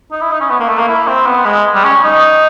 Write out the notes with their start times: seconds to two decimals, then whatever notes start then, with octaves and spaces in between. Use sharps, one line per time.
0.12 D#4
0.21 E4
0.31 D#4
0.40 C#4
0.50 B3
0.60 A#3
0.68 A3
0.79 A#3
0.88 E4
1.07 C4
1.26 B3
1.45 G#3
1.75 G3
1.84 C#4
2.03 D#4